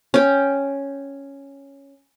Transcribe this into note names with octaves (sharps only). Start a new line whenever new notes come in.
C#4 G5